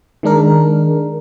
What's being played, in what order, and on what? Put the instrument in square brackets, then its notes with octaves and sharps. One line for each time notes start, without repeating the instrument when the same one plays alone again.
[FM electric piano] D#3 G#3 D4 A#4